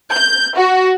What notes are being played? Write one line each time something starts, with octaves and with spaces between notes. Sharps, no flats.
G6
F#4